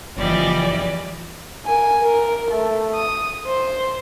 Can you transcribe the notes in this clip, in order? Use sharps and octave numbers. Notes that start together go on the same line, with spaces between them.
F#1 E3 F3 G3 D5 D#5
A#4 G#5
A#4
A3
D#6
C5